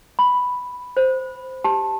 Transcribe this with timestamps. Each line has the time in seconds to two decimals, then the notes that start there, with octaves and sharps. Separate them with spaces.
0.19 B5
0.97 C5
1.64 G4 A5